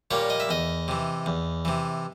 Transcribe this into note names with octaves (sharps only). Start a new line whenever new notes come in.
A#2 G3 A#3 C#5
D#5
E5
E2 D#5
C3 E3
E2
C3 E3